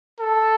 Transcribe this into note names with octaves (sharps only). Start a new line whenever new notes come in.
A4